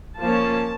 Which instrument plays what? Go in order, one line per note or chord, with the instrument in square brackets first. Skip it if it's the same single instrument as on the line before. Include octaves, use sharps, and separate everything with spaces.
[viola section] F3 A#3 C#4 A5